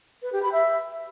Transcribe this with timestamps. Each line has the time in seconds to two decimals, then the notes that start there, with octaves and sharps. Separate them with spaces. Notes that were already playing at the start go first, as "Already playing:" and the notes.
0.23 B4
0.33 G4
0.42 B5
0.52 E5